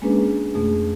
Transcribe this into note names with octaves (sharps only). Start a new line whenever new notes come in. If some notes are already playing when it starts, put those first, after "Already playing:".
G#3 A#3 C#4 D4 G#4 B4
F2 B2 A3 G#4